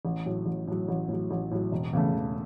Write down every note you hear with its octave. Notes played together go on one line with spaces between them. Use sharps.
A1
A2 F#3
A1
A2 F#3
A1
A2 F#3
A1
A2 F#3
E1
E2 C#3 A3
E1